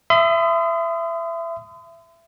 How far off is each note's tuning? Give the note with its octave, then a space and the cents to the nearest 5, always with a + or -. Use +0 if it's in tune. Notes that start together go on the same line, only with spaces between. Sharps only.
E5 +20 C6 -45 D#6 +0